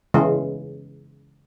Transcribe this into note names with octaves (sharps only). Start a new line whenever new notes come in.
C#3 E3 G#3